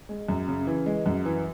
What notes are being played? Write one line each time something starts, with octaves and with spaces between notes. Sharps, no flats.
G#3
F#2
C#3
E3
G#3
F#2
E3